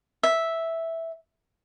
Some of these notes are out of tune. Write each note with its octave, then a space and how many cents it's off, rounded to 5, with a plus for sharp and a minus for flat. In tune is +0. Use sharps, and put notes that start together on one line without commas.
E5 -5